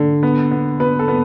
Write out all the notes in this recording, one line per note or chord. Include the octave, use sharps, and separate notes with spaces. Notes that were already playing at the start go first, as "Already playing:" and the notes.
Already playing: D3
B3
B3
B3 B4
A4
B3